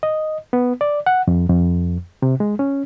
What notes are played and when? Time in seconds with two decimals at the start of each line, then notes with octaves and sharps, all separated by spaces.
0.03 D#5
0.53 B3
0.81 D5
1.06 F#5
1.27 F2
1.49 F2
2.22 C3
2.40 G#3
2.59 C#4